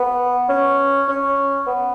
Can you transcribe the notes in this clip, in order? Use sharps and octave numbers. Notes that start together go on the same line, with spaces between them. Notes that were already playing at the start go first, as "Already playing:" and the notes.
Already playing: B3
C#4
C#4
B3